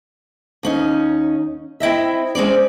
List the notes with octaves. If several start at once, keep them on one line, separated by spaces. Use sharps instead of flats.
D#2 C#4 D#4
C4 E4 D#5 E5
G#3 C4 C#4 D5